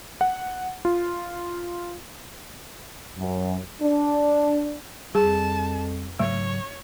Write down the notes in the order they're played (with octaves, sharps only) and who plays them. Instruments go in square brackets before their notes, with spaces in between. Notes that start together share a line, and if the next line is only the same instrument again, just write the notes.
[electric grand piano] F#5
F4
[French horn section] F#2
D4
[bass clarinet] F2 [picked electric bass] G3 [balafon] G#4 [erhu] A5
[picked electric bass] G#2 C#3 F#3 [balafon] A3 [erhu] C#5